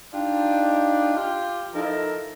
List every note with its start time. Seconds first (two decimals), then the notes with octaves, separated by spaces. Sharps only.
0.13 D4 D#4 F4 G4 D5
1.17 F4 G4
1.74 F3 D#4 E4 A4 A#4